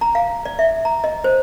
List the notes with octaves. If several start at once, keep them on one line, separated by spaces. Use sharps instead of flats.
A#5
F5
D5
E5
A#5
D#5
C5